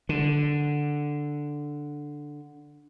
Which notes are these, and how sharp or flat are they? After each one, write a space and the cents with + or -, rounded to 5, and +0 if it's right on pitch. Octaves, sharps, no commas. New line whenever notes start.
D3 +0